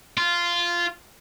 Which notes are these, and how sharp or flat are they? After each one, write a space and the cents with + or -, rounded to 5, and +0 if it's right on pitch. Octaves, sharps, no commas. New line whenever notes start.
F4 -10